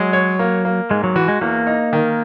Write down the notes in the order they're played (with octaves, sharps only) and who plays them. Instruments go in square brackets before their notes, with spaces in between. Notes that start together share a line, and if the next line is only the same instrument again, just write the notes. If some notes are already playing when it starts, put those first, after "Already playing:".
Already playing: [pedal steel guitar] F#3 [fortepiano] G#3
[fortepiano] C#5
A#3
A#3
[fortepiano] G#2 [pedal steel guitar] G#3
[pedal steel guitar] F#3
[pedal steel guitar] E3 [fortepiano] F#4
[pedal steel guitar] G#3
[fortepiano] E2 [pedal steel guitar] A#3
[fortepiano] D#4
D#3